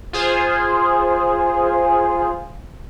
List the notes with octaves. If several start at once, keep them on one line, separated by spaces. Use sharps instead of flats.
F4 G#4 C5